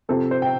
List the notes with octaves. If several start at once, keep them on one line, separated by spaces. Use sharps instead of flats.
C3 F3 C4 A4
C5
G5